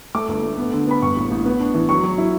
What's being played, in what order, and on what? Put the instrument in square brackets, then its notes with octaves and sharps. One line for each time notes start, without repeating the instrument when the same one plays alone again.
[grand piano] A3 D6
G1
A3
B3
D3
B3 B5
G2 C#6
A1
A1
B3
D4
E3
F#3 C#6
F#3
E4